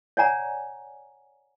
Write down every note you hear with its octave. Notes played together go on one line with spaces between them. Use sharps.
C#5 D5 F#5 G#5 A#5